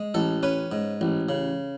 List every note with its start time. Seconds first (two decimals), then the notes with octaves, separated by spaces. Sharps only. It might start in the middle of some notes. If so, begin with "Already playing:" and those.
Already playing: G#3
0.14 A1 A4
0.43 C#4 B4
0.72 G#2
1.01 A1
1.29 C#3